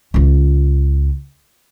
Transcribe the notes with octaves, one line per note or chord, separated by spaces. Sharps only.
C#2 F4